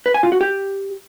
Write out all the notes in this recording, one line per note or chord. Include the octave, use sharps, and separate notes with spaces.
B4
G#5
F4
F#4
G4